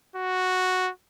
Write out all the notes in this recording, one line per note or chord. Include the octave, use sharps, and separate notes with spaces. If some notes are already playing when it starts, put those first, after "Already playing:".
F#4